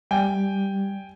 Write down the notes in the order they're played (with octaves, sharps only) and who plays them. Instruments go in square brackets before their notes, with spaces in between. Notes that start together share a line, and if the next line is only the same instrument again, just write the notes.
[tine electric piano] G3 [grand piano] G5 G#5